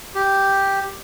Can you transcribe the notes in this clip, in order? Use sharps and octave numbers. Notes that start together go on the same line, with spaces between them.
G4